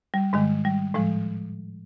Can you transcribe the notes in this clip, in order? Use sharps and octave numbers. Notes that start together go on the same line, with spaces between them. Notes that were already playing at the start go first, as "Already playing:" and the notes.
G3
G#2 D#3 G#3
G3
A2 F3 G#3